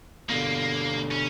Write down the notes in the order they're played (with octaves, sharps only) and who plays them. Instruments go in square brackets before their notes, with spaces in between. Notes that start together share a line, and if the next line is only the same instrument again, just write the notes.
[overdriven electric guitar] B2 D3 [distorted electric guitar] A#3
[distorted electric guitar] C#4